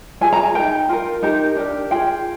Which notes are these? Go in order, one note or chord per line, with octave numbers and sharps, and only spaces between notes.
F4 G#4 G#5
A#5
G#5
D#4 A#4 G5
F4 A#4
D#4 G4 A#4
D4 G4 A#4
F4 G#4 G5